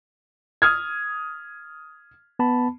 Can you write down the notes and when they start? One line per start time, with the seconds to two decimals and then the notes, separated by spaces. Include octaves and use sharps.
0.62 D#6 F6 G#6
2.39 B3 A5 B5